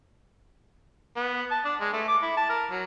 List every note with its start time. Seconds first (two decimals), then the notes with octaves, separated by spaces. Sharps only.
1.16 B3
1.51 A5
1.65 D4
1.81 G#3
1.93 A3
2.08 D6
2.22 E4
2.37 A5
2.50 A#4
2.71 F#3